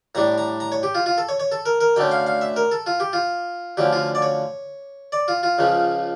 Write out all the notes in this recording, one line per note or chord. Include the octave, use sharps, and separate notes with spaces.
A2 G3 D4 A#5
A#5
A#5
C#5
G4
F4
F4
A4
C#5
C#5
A4
A#4
A#4
D2 D3 A3 C#4 G5
F5
F5
E5
A#4
A4
F4
G4
F4
D2 D3 F3 C#4 G4
F4
D5
C#5
D5
F4
F4
C#2 C#3 F3 C#4